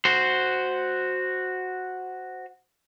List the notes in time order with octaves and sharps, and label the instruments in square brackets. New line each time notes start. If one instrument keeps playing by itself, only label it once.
[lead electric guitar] F#4 C5